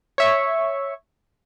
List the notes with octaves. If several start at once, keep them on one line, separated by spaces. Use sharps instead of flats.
C#5 E5 C#6